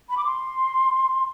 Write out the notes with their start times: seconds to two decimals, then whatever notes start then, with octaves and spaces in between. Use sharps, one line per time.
0.10 B5
0.17 D6
0.25 C6